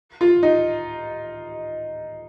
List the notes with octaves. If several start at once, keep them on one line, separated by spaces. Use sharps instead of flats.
F4
D#4